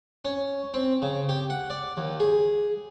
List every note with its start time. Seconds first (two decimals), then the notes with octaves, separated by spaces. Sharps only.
0.25 C#4
0.74 C4
1.02 C#3
1.29 G4
1.50 F#5
1.70 D5
1.97 D#2
2.20 G#4